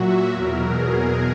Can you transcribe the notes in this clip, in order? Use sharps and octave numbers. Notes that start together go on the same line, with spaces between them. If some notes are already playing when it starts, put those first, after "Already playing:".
Already playing: A#2 F#3 F#4 E5
E2 B2 F#3 A#4
G#4